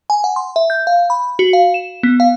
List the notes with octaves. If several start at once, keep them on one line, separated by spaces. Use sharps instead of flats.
G#5
F#5
C6
E5
G6
F5
B5
F#4
F5
E7
B3
F5